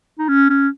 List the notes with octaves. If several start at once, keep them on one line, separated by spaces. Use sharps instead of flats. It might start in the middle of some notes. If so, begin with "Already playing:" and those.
D#4
C#4
C#4